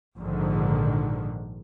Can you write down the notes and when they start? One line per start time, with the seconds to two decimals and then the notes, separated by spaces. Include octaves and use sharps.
0.17 A#1 G#2 D3 D#3